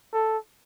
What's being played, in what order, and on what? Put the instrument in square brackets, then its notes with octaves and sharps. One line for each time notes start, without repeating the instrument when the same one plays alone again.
[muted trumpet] A4